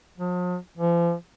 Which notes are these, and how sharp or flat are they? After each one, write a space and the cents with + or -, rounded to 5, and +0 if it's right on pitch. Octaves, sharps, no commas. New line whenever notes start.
F3 +45
F3 -40